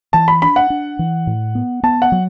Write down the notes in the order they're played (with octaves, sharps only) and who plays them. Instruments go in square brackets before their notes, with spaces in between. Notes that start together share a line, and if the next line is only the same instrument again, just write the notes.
[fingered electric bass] E3 [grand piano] A5
[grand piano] B5
[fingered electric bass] D4 [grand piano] B5
[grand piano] F#5
[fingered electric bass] D4
E3
A2
B3
[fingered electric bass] B3 [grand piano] A5
[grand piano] F#5
[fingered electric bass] F#3